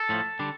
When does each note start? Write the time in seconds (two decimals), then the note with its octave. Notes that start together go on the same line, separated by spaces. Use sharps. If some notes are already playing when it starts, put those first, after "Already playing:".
Already playing: A4
0.09 A2 F3 A3
0.39 D3 G3 D4